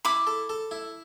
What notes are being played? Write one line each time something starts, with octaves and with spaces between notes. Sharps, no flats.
E4 B5 D6
A4
A4
E4